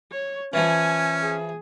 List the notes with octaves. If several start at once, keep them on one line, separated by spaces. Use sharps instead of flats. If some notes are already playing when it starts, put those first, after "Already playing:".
C#5
E3 F3 C#4 G#5
G#4